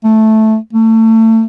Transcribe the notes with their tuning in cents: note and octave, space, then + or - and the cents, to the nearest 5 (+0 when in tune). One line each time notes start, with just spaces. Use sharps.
A3 -5
A3 +30